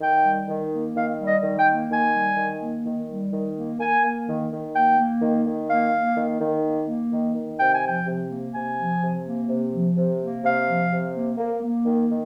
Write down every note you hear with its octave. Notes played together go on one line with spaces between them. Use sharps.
D#3 G5
G3
D#3
A#3
D#3 F5
G3
D#5
D#3
G5
A#3
D#3 G#5
G3
D#3
A#3
D#3
G3
D#3
A#3
A#3 G#5
A#3
D#3
D#3
A#3 G5
A#3
D#3
D#3
A#3 F5
A#3
D#3
D#3
A#3
A#3
D#3
D#3
C3 G5
G#5
F3 G5
C3
A#3
C3 G#5
F3
C3
A#3
C3
F3
C3
A#3
C3 F5
F3
C3
A#3
A#3
A#3
D#3
D#3